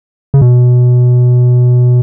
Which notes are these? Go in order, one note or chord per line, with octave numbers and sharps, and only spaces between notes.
C#3
B2